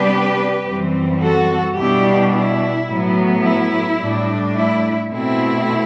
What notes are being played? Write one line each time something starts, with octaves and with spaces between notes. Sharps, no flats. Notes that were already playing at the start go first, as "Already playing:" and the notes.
Already playing: C3 G3 B3 D4 G4 B4
F#2 E3 G3 C4
F#4 A4
B2 G3 D4 E4 G4
E4
A2 F#3 B3
E4
A2 G3 D4
E4
B2 A3 C4 E4